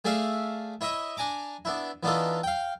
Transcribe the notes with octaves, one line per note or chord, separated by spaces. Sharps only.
A3 G#4 D5 E5 F5
E4 C#5 D#5 E5
D4 G#5 A#5 D6
B3 D4 E4
E3 B3 D4 D#4 F4 A4
F5 G5